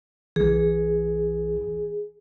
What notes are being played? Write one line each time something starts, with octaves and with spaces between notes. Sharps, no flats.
B1 E3 G#4